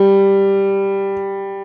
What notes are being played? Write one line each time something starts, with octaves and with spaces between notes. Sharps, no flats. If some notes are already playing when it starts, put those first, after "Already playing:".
Already playing: G3